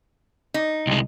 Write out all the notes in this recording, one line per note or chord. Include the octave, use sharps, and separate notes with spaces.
D#4
C2 G#3